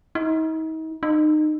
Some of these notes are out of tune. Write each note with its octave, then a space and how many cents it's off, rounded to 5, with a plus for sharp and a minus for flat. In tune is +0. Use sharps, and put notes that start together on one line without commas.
D#4 +40
D#4 -25